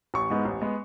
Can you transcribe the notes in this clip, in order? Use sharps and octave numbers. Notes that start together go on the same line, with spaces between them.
A1 C#6
G#2 G#3 B3
A1
G#3 B3